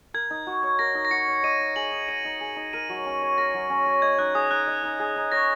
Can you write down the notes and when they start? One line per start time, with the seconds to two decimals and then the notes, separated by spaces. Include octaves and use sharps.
0.14 A#4 G#6
0.30 D#4
0.47 F#4
0.63 C#5
0.79 A#4 A#6
0.95 D#4
1.05 A#6
1.11 F#4 C#7
1.28 C#5
1.44 D#5 D#7
1.60 D#4
1.76 G#4 F#7
1.92 D#4
2.08 D#5 D#7
2.25 D#4
2.41 G#4
2.56 D#4
2.73 A#4 D#7
2.89 F#3
3.05 C#4
3.22 C#5
3.38 A#4 A#6
3.54 F#3
3.70 C#4
3.86 C#5
4.02 D#5 G#6
4.18 D#4 F#6
4.35 G#4 D#6
4.51 D#4 F#6
4.67 D#5
4.83 D#4
4.99 G#4
5.16 D#4
5.32 C#5 A#6